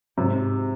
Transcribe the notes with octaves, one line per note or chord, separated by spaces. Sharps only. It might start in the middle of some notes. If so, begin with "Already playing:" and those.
G#2 C3